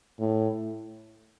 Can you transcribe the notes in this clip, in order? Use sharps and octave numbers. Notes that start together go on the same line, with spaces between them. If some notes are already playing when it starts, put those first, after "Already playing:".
A2